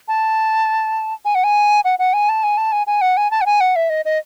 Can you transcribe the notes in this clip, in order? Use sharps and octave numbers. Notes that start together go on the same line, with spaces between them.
A5
G#5
F#5
G#5
F#5
F#5
G#5
A5
G#5
A5
G#5
G#5
F#5
G#5
A5
F#5
G#5
F#5
E5
D#5
D#5